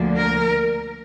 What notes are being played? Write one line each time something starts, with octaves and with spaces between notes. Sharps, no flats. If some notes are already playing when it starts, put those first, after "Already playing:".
Already playing: D2 D3 F3 A#3
A#4